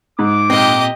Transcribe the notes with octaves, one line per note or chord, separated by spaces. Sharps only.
G#2 D6
A#2 C4 G4 D#5